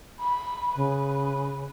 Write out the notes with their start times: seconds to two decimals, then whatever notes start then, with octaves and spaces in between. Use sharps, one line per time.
0.19 B5
0.75 C#3 B4